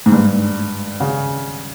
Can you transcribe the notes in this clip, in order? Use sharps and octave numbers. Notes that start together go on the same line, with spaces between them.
G#2
G2
C#3